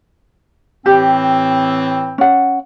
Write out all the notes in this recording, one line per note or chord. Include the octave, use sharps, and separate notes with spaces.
A2 E3 C4 G4
C#4 F#5